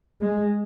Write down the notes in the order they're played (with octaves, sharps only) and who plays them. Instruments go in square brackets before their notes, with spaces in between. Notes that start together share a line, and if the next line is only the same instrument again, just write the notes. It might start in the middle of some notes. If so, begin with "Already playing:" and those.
[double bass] G#3